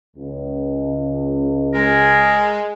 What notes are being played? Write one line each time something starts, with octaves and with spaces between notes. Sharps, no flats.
C#2
G#3 G#4 A#4